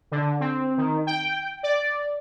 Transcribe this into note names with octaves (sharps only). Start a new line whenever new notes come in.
D3
C4
D#3
G5
D5